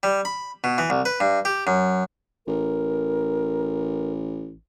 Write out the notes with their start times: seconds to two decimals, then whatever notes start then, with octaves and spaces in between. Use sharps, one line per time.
0.03 G3
0.25 B5
0.64 B2
0.78 E3
0.90 C2
1.05 B4
1.20 G2
1.45 G4
1.67 F#2
2.47 A1 A#4